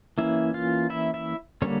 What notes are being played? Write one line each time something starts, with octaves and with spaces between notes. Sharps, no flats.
E3 A#3 C#4 E4 E5
F4 F5
E4 E5
E4 E5
D3 G3 A#3 C#4 C#5